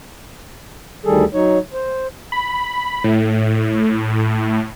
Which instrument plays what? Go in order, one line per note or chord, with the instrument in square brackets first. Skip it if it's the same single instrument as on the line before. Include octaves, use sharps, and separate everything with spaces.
[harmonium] D2 D#3 G3 G#4 A4
F#3 D#4 C#5
C5
[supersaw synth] B5
A2